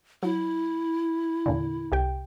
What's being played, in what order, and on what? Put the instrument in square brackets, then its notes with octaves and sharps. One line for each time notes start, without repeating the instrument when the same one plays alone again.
[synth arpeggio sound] F#3 [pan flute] E4
[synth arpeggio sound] E2 A#2 D3
C2 G4 G5